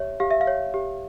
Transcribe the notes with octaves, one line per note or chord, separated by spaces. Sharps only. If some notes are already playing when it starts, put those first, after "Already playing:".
Already playing: G4 C#5 E5
G4 F5
E5
F5
C#5
G4